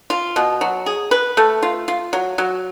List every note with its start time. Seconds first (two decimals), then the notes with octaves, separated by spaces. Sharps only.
0.10 F4
0.36 B2
0.61 F#3
0.86 G#4
1.11 B4
1.37 A3
1.63 F4
1.88 F4
2.13 F#3
2.38 F#3